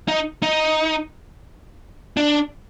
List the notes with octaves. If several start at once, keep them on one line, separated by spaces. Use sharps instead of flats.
D#4
D#4
D4